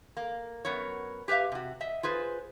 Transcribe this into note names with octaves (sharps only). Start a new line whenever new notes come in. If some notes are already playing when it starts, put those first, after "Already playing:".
A#3
F#2 B3 A#4 C#5
G4 B4 C#5 E5 F5
C3 F#4
D#5 E5
F4 G#4 B4 C5